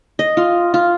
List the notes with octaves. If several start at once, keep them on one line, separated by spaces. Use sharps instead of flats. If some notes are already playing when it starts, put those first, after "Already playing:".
D#5
F4
F4